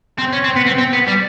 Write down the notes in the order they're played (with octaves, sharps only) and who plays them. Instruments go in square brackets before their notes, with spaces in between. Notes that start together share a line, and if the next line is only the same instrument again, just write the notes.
[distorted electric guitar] C4
C#4
C4
B3
C4
C4
B3
G3